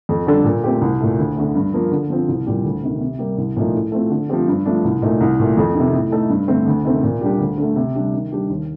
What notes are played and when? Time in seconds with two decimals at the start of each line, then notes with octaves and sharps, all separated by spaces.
0.09 F2
0.27 D3 G3 D4 A4
0.44 A#2
0.64 A3 C4 G4
0.81 C2
1.01 A#2 A3
1.18 D2
1.36 D3 A3
1.55 G2
1.74 F3 A#3
1.91 D3
2.10 F3 C4
2.29 C2
2.47 A#2 G3
2.64 D2
2.83 C3 D#3
3.00 C3
3.19 G3 A#3
3.38 C2
3.56 A#2 F3 A3 D#4
3.75 A2
3.92 A3 C4 F4
4.10 D3
4.29 F3 A3 C4 G4
4.48 G2
4.66 F3 A3 D4
4.85 C2
5.02 A#2 A3 D#4
5.21 C2
5.39 A#2 A3
5.57 F2
5.75 C3 D#3
5.93 A2
6.12 A3 D#4 A4
6.30 G2
6.48 D3 A3 C4
6.66 D2
6.85 C3 D#3 A3 C4
7.03 A#2
7.21 G3 D4 G4
7.40 D2
7.58 D3 A3
7.76 C3
7.95 G3 D4
8.14 D#3
8.32 G3 D4 G4
8.49 D#2